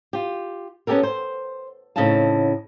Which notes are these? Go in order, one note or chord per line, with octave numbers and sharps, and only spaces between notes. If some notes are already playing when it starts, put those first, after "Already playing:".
F4 G4
B3 C#4 D4 G4 A4 A#4
C5
A2 C#3 C4 D#4 F5 A5